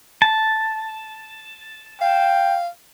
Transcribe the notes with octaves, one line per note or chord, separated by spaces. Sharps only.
A5
F5 G5